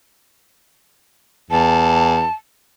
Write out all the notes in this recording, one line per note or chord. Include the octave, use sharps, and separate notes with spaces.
E2 A5